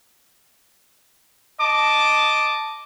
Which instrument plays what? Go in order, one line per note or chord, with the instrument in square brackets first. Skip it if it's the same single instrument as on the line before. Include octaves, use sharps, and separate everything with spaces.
[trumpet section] D#5 A5 D6